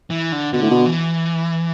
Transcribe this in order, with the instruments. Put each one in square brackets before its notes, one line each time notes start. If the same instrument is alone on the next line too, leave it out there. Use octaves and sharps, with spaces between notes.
[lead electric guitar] E3
D3
[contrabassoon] B2 [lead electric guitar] D3
[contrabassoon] A2
B2
[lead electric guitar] E3